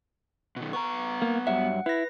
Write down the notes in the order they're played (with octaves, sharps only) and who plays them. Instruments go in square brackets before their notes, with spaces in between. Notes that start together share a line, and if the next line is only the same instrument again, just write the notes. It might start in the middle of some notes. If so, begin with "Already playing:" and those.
[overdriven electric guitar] B2 D#3
[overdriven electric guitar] B3 A#5 [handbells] C#6
[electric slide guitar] A#3
[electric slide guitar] G2 F#3 E5 [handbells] F#5
[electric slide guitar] E4 [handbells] B4 A#6